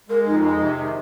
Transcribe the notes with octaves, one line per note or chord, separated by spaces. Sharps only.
G#3 A#4
F2 D#4
G#3
C3
D#3